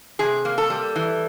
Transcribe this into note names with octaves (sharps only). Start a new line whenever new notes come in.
C3 G#4
A#3
A4
G3
E3